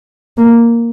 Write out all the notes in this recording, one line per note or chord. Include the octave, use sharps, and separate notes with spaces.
A#3